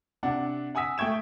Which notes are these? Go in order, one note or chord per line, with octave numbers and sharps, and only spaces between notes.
C3 D4 F#5
F#5 G#5 D#6 E6 B6
A3 G5 C#6 G#6 E7